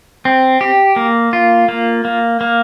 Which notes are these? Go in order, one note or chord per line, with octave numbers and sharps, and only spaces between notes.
C4
G4
A#3
F4
A#3
A#3
A#3